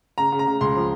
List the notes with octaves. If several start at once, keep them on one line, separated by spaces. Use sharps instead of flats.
C#3 A#5
C#3
A#5
C#3
C#2 C6
F3